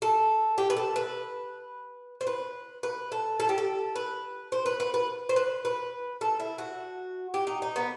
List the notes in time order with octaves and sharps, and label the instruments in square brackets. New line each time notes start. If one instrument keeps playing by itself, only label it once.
[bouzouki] A4
G4
B4
A4
B4
C5
B4
B4
A4
A4
G4
A4
B4
C5
B4
B4
B4
C5
B4
B4
A4
E4
F#4
G4
D#4
D#4
B3